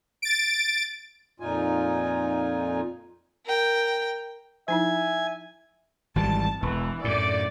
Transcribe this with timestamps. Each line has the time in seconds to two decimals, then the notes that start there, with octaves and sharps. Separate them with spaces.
0.22 A6 D7
1.40 F2 A#2 D#4 F4 G#5
3.46 A#4 G5
4.68 F3 D#4 E4 E5 G#5
6.16 G#1 E3 G3 A5
6.62 E1 E3
7.04 F#2 A2 D5